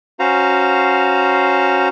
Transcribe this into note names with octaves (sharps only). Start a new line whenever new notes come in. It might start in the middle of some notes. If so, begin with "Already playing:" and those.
C#4 F#4 C5 F5 A#5